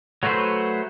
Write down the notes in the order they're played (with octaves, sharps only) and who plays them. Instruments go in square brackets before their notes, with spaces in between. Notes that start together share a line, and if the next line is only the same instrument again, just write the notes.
[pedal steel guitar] F#3 A3 F#4 B4 C5